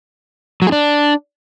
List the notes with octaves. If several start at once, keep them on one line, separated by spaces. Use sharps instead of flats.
F#3
G#4
D4